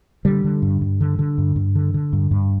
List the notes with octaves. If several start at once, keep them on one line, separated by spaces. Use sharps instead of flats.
D3 G3
D3
G2
G2
D3
D3
G2
G2
D3
D3
G2
G2